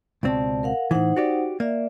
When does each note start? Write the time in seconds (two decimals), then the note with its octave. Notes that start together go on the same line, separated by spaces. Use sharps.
0.23 C#2 B2 C4 D5 A5
0.63 A#4 F5 F#5
0.91 A2 E3 D#4 C5 F#5
1.16 F#4 G4 D5
1.60 A#3 D5 E5